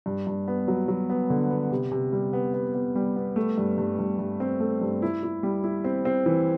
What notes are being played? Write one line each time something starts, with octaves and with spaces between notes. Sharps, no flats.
G2
G2
B3
F#3
F#3
B3
D3
B3
C3
C3
G3
B3
B3
B3
G3
B3
A3
G2
G2
G2
G2
C4
A3
G2
E4
E4
G3
E4
C4
C4
E3